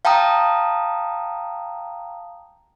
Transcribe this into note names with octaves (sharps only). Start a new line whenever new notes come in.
F5 G5 A5 A#5 D#6